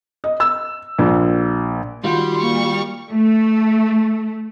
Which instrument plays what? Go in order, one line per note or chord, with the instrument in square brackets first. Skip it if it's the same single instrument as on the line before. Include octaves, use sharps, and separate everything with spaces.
[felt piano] D#5
E6
A#1
[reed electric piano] D#3 F4 F#4 [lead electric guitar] G3 [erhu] C6
[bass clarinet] A#3 [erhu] C#6
[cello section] A3